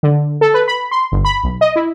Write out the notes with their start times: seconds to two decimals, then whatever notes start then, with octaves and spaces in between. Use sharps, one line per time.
0.03 D3
0.41 A4
0.54 B4
0.68 B5
0.91 C6
1.12 G1
1.25 B5
1.44 B1
1.61 D#5
1.76 E4